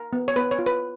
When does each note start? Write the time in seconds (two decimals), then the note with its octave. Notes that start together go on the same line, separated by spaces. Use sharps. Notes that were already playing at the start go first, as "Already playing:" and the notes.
Already playing: A#4
0.13 B3
0.28 C#5
0.36 B3 B4
0.51 C#5
0.59 F4
0.66 B4